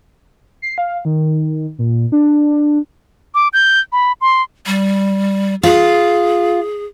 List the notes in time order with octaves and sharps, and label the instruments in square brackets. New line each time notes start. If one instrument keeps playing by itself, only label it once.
[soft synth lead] C7
F5
D#3
A#2
D4
[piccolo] D6
G6
B5
C6
[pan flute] G3
[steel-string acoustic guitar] F4 [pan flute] G#4